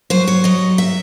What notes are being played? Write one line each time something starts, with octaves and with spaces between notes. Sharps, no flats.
F#3 C5
C#5
F#3 D#5
E5